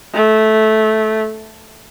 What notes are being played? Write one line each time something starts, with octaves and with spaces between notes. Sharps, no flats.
A3